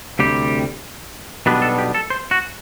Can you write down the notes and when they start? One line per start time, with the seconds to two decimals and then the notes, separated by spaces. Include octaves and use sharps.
0.19 D2 C3 G3 G4
1.46 B1 B2 G3 B3 D4 B4
1.62 A4
1.78 G4
1.94 A4
2.10 C5
2.31 F#4